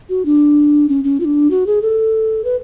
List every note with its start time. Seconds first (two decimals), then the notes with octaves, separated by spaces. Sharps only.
0.09 F#4
0.25 D4
0.89 C#4
1.04 C#4
1.20 F4
1.25 D4
1.51 F#4
1.67 G#4
1.82 A4
2.44 B4